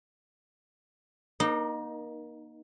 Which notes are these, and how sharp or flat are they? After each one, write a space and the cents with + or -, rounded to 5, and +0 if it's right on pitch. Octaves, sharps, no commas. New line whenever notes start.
A#3 +30 D#4 -15